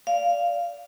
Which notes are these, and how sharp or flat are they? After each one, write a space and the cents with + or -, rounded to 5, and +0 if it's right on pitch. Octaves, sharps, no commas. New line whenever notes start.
D5 -15 F5 -10